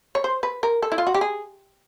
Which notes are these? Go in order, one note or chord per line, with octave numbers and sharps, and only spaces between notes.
C#5
C5
B4
A#4
A4
E4
F4
F#4
G4
G#4